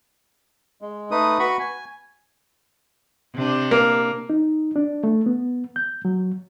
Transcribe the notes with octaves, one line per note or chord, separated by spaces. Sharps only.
G#3
A3 D#4 B4 D#6
F#4 B4 B5 C#6
G#5
C3 D4
A#3
D#4
D4
A3
B3
G6
F#3